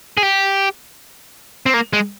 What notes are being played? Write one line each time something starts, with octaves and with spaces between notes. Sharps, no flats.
G#4
G4
C4
A#3
G#3